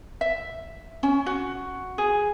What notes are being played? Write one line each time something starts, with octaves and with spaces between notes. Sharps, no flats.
E5
C#4
F#4
G#4